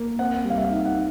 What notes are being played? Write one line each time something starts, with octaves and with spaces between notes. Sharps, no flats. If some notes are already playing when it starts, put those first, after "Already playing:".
Already playing: A#3
C4 F#5
G3
F5
E5
D#4
F#5